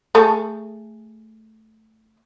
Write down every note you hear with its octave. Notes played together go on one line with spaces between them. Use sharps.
A3 G#4 A4